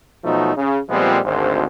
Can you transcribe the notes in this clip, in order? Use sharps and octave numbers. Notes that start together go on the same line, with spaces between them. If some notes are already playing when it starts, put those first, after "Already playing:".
B2 F3 F#3 A3 D#4
C#3
A#2 F3 G3 G#3 B3 C4
G#1 D2 C5